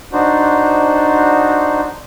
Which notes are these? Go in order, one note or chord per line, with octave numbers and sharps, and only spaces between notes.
D4 D#4 F#4 C5